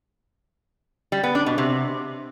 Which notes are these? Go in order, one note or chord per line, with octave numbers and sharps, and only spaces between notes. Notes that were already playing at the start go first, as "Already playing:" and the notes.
G3
B3
D4
B2
C3